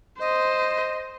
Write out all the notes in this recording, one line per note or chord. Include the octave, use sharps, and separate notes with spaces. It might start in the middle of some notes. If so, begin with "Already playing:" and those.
C5 D#5